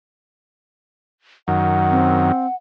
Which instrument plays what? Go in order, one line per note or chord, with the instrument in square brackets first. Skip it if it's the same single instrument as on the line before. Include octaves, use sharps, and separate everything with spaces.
[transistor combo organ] F#2 D#3 [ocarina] F#5
[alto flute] C4